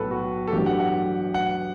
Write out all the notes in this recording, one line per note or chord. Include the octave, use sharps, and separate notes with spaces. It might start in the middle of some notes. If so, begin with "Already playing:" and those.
Already playing: B1 A2 F#3 A4 B4
F#4
A4
A1 G2 F#3 G4
F#5
F#5
F#5